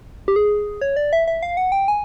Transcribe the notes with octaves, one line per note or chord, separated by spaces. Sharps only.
G4
G#4
C#5
D5
E5
E5
F5
F#5
G5
G#5